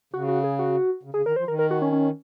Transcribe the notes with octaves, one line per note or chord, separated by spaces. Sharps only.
C#3 F#4
F#4
G#4
F#4
C#3
C#3 G#4
D#3 A#4
F3 C5
D#3 A#4
A#4
F#4
C#4
C#4